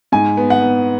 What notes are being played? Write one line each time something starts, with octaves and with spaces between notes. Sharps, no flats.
G#2 G#5
B3
F#5
B3